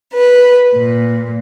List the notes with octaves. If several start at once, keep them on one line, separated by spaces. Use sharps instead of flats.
B4
A#2